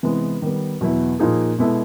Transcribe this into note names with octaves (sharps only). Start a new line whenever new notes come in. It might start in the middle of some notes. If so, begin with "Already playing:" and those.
C3 E3 G#3 B3
D#3 G3 B3
E2 B2 F#3 B3 E4
A#2 F3 A#3 D#4 G#4
B2 G#3 B3 E4 A4